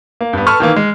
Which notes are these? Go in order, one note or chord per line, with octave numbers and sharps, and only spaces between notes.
A#3
G2 B3
A4 B4 A5 C#6 F6
D#3 E3 A#3
G#3